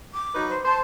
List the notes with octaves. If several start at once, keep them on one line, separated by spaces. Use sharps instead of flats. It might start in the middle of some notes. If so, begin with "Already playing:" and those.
D6
F#3 D#4 B4
C5
C5 A5